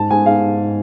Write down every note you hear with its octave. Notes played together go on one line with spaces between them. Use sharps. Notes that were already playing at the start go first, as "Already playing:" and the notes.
Already playing: G#2 A5
G#2 G#5
F5